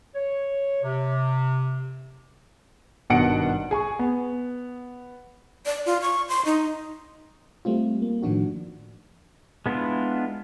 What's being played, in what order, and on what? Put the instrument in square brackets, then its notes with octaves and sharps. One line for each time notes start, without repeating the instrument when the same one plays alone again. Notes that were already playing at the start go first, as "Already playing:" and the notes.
[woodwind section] C#5
C3
[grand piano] G#1 G2 B2 F#5 C#7 D7
G#4 G#5 C#6
B3
[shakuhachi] D5
F4
C#6
C6
D#4
[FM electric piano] G3 A3 C4 F4
A#3
A2 D#3 F3 D4 F#4
[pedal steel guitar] G#3 B3 D4 E4 F4